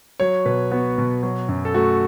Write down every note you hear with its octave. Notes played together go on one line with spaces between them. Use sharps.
F#3 C#5
B2 B4
B3 F#4
B2
F#3
F#2
A4
A3 F#4